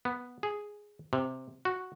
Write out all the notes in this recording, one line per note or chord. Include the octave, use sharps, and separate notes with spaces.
B3
G#4
C3
F#4